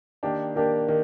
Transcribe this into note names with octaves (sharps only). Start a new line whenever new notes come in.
D#3 A#3 D4 G4
D#3 A#3 D4 G4
D#3